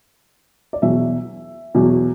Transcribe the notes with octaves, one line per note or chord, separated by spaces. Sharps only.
D5
E2 B2 F#3 E5
E2 B2 F#3